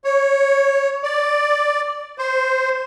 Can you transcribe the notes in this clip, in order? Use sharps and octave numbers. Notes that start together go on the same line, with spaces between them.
C#5
D5
C5